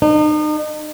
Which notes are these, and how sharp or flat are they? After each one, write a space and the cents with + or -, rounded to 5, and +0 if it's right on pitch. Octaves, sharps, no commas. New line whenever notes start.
D#4 -40